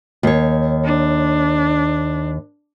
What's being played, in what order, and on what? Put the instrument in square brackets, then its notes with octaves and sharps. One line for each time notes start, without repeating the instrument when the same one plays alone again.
[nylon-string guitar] D#2 C#5
[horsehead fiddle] D4